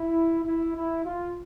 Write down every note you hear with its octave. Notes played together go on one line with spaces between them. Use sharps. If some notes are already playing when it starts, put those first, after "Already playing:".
Already playing: E4
E4
E4
F4